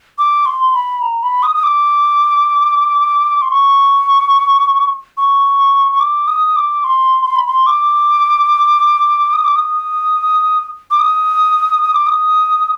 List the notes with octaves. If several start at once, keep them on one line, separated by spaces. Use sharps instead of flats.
D6
C6
B5
A#5
B5
D#6
D#6
D6
C6
C#6
C#6
C#6
D6
D#6
D6
C6
C6
B5
C6
D6
D#6
D6
D#6
D6
D#6
D#6
D6
D#6